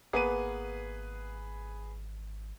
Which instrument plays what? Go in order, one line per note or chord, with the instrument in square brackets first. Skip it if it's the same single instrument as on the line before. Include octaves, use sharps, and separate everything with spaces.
[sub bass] G#1 [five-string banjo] A#3 B3 [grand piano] G#4 B4 D#7